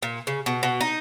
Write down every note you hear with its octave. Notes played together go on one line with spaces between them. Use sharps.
A#2
C#3
B2
B2
D#4